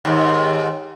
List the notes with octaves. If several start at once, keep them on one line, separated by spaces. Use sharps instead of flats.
D#2 G#2